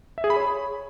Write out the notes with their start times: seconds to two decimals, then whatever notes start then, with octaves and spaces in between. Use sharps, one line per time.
0.18 E5
0.24 G#4
0.30 B5
0.36 C#5